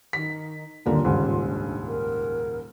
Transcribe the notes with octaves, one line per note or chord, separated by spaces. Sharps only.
D#3 B6
D#1 D3 A#3 F4
D#1 C#2 G#2
D4
A#4